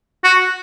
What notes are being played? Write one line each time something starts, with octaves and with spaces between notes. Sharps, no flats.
F#4